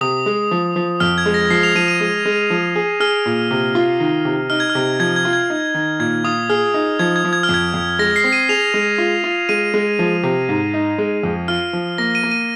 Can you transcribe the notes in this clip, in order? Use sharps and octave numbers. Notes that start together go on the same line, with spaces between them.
C3 D#6
G#3
F3
F3
F2 F6
G#6
G#3
A#6
F3 C7
F7
F3 D#7
D#7
G#3
G#3
F3
G#4
G#4 F6
A#2
C3
F4
D#3
C3
D#4 F6
G#6
F6
C3
F3 G#6
G#6
F4
G#6
D#4
D#3
A#2 G#6
F4 D#6
G#4 F6
D#4
F3 G#6
G#6
F3
G#6
F6
F2 G#6
F2
G#3 A#6
C7
C4
D#7
G#4 F7
G#3
F4
F4
G#3 D#7
G#3
F3
C3
G#2
D#4
G#3
F2
F4 F6
F3
A#3 A#6
D#7
A#3
D#7